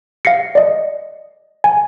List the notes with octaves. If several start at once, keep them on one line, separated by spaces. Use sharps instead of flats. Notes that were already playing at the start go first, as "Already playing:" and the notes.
F5 A#6 C7 C#7
D5 D#5
G#5